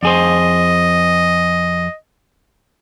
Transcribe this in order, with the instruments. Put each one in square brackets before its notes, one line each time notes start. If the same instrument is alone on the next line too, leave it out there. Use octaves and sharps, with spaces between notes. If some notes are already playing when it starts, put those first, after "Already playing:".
[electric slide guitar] F2 G#4 C5 [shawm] D#5